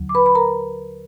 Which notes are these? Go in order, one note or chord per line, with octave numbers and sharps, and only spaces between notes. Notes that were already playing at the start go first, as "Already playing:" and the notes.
Already playing: D#2 D3 F#3
D6
B4 B5
B5
A#4 A#5